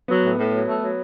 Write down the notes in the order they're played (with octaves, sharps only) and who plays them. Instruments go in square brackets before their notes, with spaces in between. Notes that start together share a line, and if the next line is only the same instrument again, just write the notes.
[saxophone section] F#3 [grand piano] B3
[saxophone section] A2
A2
F#3
A3
F#3